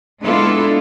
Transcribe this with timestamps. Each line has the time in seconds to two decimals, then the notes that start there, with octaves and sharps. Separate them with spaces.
0.21 G#3 B3 D4 E4 F4 A4